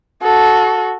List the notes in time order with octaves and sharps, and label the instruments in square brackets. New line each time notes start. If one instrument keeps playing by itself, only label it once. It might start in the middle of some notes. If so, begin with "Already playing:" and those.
[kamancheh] F#4 A4